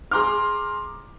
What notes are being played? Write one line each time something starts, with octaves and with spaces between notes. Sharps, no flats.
G#4 A#5 C6 D6 F6